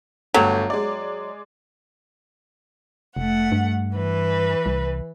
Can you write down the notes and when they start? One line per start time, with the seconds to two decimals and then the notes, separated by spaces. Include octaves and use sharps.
0.34 G1 F#3 A3 G5
0.70 G#3 D5
3.17 F1 A3 F#5
3.52 G2
3.94 E3 B4
4.66 C2